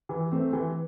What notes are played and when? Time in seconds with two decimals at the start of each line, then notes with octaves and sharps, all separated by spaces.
0.09 E3
0.32 A3 C4
0.53 E3